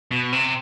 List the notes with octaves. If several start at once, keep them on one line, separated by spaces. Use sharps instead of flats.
B2
C3